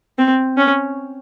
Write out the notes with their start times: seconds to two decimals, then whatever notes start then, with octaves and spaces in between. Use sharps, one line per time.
0.18 C4
0.57 C#4